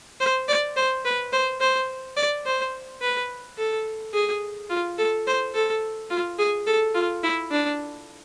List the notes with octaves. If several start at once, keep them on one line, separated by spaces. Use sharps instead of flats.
C5
D5
C5
B4
C5
C5
D5
C5
B4
A4
G#4
F4
A4
C5
A4
F4
G#4
A4
F4
E4
D4